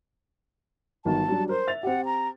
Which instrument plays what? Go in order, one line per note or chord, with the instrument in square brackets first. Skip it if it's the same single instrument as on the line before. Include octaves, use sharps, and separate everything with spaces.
[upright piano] G1 D#3 F#3 [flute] A5
[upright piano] F#3 G3 D4
[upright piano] A#4 [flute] C5
[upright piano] E5 A6 F7
[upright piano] C4 G4 [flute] F#5
[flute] A#5